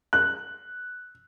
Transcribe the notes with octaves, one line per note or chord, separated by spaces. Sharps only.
F#6